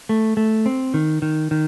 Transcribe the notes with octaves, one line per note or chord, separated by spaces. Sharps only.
A3
A3
C4
D#3
D#3
D#3